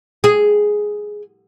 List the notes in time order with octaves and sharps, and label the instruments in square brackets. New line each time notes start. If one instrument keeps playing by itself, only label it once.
[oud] G#4